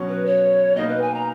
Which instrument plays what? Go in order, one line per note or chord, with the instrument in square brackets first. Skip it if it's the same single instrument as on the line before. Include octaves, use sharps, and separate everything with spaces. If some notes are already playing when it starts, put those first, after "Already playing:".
Already playing: [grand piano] B2 F#3 C#4
[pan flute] B4
C#5
[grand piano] B2 A#3 D#4 [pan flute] D#5
[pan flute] B4
G#5
A#5